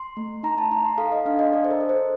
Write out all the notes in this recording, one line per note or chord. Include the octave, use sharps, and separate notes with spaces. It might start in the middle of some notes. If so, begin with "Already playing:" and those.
Already playing: C6
A3
D#4 A#5
A5
D#4 A#5
C6
A4 F5
D#5
D4 F5
D#5
A4 D5
C5
A#4
A4
C5